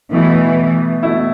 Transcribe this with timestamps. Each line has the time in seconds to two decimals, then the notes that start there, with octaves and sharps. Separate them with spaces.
0.12 B2 E3 A3 E4
1.03 B2 A3 E4